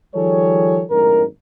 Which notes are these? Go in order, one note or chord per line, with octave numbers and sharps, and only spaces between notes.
D#3 F3 G3 G#4 A4 C#5
G#1 F#2 A2 D#3 A#4